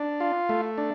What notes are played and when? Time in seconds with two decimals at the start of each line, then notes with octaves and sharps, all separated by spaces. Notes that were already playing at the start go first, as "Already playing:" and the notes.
Already playing: D4
0.20 F4
0.49 A3
0.78 D4